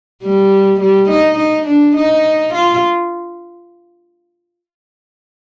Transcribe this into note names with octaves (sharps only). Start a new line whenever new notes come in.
G3
G3
D#4
D#4
D4
D#4
F4